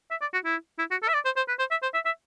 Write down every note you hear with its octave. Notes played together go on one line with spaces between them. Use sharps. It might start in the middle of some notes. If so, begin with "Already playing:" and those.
E5
D5
F#4
E4
E4
F#4
A4
E5
D5
C5
C5
B4
C5
E5
C5
E5
E5